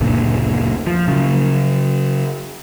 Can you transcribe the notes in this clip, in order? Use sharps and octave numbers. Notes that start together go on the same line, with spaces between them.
F#1 D2 A#2 D3
F3
C#3 F#3